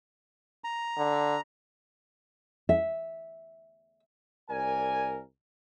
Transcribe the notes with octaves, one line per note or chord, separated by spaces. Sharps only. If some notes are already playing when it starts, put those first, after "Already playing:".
A#5
D3
E5
C2 A#4 D5 G#5